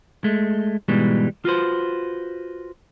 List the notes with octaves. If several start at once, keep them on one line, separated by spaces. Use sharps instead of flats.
G#3 A3
G#2 B2 E3 G3 G#3
F4 F#4 B4 C5